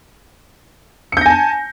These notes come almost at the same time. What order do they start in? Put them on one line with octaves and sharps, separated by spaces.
C#7 G6 A#6 G#5 A5